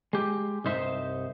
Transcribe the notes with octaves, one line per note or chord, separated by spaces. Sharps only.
G#3 G4
C2 G2 D#4 C5 E5